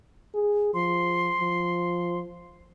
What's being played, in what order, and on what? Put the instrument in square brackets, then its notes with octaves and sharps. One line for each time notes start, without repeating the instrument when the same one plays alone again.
[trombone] G#4
[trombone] F3 [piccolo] C6
[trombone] F3